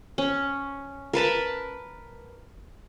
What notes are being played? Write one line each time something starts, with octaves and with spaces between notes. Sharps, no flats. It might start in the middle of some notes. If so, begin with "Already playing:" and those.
C#4
A#4 B4 A5 B5